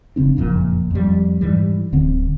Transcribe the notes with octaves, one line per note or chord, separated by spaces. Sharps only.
F1 C#3 C4 D4
F#1 F2 A#2
F2 G3
G#2 E3 G3
D1 D3 C4